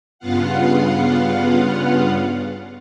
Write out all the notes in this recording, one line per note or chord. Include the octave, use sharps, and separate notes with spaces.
G2 C#3 B3 F4 F5 F#5